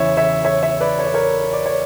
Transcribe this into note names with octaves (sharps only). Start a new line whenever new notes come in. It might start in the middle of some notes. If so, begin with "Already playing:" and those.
Already playing: E2 C#3 E3 C#5 E5
C#5 E5
C#5 E5
C#5 E5
B4 D5
C#5
D5
A#4 C#5
D5
C#5